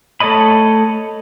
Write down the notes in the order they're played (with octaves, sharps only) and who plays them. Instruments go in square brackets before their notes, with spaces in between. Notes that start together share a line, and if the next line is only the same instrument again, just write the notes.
[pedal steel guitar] A3 A4 C#5 D#5 B5